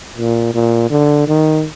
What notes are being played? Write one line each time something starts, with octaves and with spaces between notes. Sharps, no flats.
A#2
A#2
D3
D#3